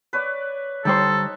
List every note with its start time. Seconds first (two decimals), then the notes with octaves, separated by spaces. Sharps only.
0.13 B4 C#5 D5
0.85 D3 G3 D#4 A4 C5 C#5